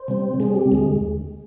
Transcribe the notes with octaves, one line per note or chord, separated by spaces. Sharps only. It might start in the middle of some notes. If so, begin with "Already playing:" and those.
Already playing: C5
C3 G3 C4
C3 G3 C4 G#4
G4
D#2 D3 G#3 G#4